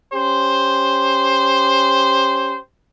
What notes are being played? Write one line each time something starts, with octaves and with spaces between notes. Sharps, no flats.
C#4 G4 C5